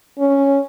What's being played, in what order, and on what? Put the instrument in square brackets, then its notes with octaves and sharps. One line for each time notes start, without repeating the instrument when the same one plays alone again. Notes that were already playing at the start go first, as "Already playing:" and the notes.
[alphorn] C#4